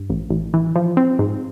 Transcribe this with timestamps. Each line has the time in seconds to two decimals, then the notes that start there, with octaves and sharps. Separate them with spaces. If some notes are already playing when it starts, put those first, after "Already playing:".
Already playing: G2
0.10 A1
0.30 A1
0.54 E3
0.76 F3
0.97 C4
1.19 G#2